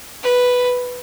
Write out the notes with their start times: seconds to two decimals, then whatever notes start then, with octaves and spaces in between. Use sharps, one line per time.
0.23 B4